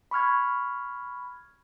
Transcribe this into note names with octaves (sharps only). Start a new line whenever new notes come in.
B5 C#6 F6 G#6